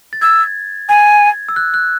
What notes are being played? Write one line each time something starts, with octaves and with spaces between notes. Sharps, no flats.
A6
E6 G#6
G#5 G#6
E6
F#6
F#6